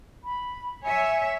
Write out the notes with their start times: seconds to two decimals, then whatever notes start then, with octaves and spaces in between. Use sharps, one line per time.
0.24 B5
0.83 C#5 E5 G#5